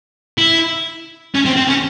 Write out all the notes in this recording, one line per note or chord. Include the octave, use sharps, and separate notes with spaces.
E4
C#4
C4
C4
C#4